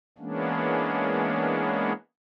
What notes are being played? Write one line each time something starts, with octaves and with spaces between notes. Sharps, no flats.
E3 G#3 A#3 B3 C#4 D4